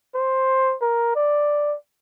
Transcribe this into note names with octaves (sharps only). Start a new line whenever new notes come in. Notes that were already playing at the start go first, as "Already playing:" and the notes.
C5
A#4
D5